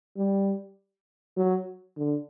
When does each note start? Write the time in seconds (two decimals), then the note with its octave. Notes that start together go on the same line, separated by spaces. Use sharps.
0.17 G3
1.37 F#3
1.97 D3